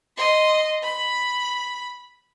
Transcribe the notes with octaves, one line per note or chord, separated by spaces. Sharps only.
D#5 C6
B5